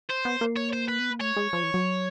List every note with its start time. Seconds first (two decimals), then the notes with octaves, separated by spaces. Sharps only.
0.10 C5
0.25 B3
0.41 A#3
0.56 C#5
0.73 C5
0.88 B4
0.99 B3
1.10 A#3
1.21 A3 C#5
1.36 G#3
1.53 F3
1.63 E3
1.74 F#3